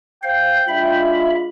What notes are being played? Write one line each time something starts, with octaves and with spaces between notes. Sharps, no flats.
C5 F5 G5
G#3 D4 F4 E5 B5